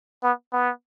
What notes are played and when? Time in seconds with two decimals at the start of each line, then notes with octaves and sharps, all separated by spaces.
0.23 B3
0.53 B3